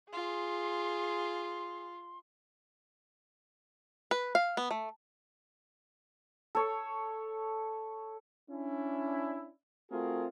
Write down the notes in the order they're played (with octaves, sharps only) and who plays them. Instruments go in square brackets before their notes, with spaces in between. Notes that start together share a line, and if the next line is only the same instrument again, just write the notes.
[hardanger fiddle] F4 [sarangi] G#4 [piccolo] C6
[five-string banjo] B4
F5
B3
A3
[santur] A4 C#5
[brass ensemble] C#4 D4 E4
A3 C4 F4 F#4 G#4 A#4